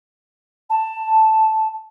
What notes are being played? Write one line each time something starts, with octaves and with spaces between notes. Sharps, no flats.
A5